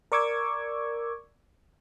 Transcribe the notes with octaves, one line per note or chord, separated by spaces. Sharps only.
A#4 D5 C#6 D6 E6 G#6